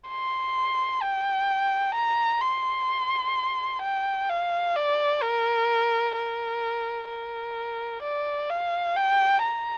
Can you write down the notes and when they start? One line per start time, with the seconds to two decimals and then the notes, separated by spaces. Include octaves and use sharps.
0.08 C6
1.02 G5
1.95 A#5
2.42 C6
3.82 G5
4.29 F5
4.76 D5
5.22 A#4
6.16 A#4
7.09 A#4
8.03 D5
8.50 F5
8.97 G5
9.44 A#5